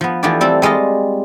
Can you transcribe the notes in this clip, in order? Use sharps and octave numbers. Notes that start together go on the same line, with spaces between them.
F3 B3
E3 F3 A3 B3 G4 D5
G3 C4 A4
G3 G#3 F4 D#5